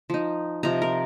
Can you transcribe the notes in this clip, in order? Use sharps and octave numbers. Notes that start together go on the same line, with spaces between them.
F3 D#4
C3 F3 D#4 A#5
A#4